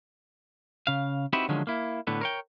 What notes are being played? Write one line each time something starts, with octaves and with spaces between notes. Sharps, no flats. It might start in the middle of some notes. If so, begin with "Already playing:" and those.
C#3 F5
C4 D#4 E4 F#4 G4 B4
D3 D#3 F3 F#3 G#3 C#4
A#3 E4
A2 D3 B3
A#4 C#5 G5